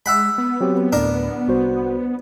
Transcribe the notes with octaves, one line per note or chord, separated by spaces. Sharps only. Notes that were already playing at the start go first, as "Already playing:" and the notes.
G#3 E5 F#5 B5
B3
F#3 C4 G4
D2 A2 D4 A#4
C2 F#4 C5